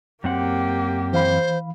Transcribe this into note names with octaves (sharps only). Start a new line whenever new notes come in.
F#2 A#3 C4 G4 F#5
E3 C5 F5 B5